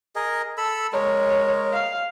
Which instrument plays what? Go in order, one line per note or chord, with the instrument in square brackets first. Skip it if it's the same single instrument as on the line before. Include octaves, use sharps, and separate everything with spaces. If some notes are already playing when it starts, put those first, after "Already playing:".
[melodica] G#4 A#4 D#5
A4 B5 E6
[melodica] G#3 A#4 [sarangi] C#5
[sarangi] F5